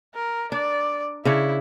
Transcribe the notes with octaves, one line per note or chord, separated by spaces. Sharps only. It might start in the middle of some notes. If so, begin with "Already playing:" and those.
A#4
D4 D5
C#3 D4 E4 C#5